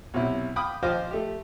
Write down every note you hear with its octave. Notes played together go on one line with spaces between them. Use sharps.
B1 C3 E4
F5 G5 B5 D6 D#6
F3 C5 D#5 F5 G5 D6
A3 G4